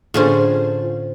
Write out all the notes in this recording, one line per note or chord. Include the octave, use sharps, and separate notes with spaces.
A2 D3 C#4 F4 G#4 C5